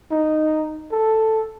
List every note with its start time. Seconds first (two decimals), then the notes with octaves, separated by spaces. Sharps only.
0.11 D#4
0.92 A4